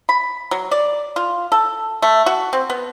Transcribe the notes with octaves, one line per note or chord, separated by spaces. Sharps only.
B5
F#3
D5
F4
A4
A3
F#4
C4
B3